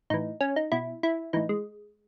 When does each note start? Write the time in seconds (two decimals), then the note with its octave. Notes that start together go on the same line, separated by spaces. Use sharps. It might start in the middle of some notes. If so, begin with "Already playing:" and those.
0.10 A2 E3 D#4
0.41 C#4
0.56 D#4
0.72 B2 E4
1.03 E4
1.33 A2 E3 D#4
1.49 G#3